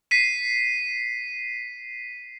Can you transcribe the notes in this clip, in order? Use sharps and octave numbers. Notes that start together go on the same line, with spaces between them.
B6 C7 D#7